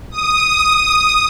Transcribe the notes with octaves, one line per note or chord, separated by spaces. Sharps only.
D#6